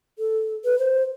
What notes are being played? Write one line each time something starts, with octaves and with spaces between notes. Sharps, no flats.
A4
B4
C5